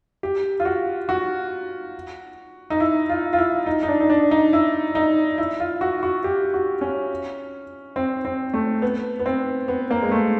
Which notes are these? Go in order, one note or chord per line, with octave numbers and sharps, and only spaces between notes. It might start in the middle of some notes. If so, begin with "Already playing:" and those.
G4
F4
F#4
F#4
D#4
E4
F4
F4
E4
D#4
D#4
D4
D#4
D4
D#4
E4
D#4
E4
F4
F#4
F#4
G4
F#4
C#4
C4
C4
A3
B3
B3
C4
B3
A#3
G#3
A3